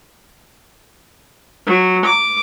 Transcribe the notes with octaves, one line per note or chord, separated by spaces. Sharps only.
F#3
D6